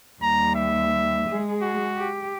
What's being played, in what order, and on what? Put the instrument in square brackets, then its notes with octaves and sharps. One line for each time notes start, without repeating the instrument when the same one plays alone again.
[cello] D#2 G3 [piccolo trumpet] A#5
[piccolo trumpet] E5
[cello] G#3 G#4
[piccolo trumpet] F#4
[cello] G4